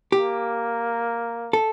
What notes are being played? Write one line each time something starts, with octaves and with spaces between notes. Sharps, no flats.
A#3 G4
A4